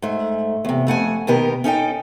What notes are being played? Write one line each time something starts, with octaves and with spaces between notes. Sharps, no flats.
G#2 A3
E2 C3
F2 A3 F#5 G#5
B2 D#3 B3 G4 A#4
C#4 D#4 A4 G5